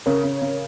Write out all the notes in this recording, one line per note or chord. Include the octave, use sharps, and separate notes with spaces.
C#3 A#4 C#5
C#3
C#3